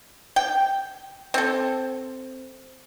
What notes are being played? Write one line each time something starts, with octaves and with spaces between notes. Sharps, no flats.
G5
C4 A4